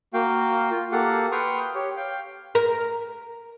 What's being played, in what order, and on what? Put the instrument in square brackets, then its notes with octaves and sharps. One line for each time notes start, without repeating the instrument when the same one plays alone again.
[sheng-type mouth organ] A#3 F#4 F5 G5
F4
A#3 G4 A4 F5 F#5
B4 G5 C6 C#6 D#6 F6
G4 C#5
F5 G5
[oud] A#4